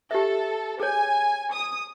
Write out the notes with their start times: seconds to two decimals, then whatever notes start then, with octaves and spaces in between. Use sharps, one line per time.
0.11 G4 A4 E5
0.80 G#4 C#5 G#5
1.52 D#6